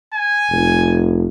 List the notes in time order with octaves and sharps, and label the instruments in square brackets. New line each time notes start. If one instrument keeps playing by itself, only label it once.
[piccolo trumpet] G#5
[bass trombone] F1